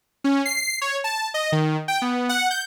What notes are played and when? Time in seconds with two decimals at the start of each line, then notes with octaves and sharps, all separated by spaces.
0.24 C#4
0.45 C7
0.81 C#5
1.04 A5
1.34 D#5
1.52 D#3
1.88 G5
2.02 B3
2.29 F#5
2.51 G6